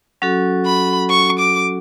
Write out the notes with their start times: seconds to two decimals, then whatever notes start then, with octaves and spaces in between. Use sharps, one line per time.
0.22 F#3 C#4 F#4 A4
0.66 B5
1.10 C#6
1.39 D6